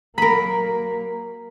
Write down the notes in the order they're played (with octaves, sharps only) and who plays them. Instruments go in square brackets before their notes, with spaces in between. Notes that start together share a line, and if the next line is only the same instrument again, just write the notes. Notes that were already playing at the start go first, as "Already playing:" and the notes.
[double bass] F#3 A#3 [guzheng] A#4 B5 [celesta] A#5 B6